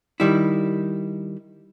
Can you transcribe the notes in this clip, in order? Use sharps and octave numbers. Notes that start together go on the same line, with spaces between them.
D#3 G3 E4